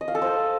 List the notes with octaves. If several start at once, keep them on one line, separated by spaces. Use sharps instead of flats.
D#5
F5
A4
C5